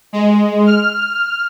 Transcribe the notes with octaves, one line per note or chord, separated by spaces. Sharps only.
G#3
F6